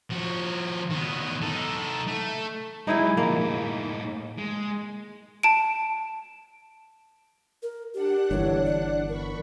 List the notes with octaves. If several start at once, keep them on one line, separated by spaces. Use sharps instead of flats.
F3 F#4
D#3 B3
D#4 A4
A3
F#3 G#3 D#4 E4 G#4
D3 F3 A#3
A2 D#4
G#3
A5 D7
A#4
D4 G4 F#5 F#6
G1 E3 C#5
D5
A#4 B5 C#6